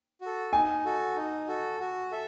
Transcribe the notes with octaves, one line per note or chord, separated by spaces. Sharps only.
F#4 A4
D#4 G#5
F#4 A4
D#4
F#4 A4
F#4
A4 E5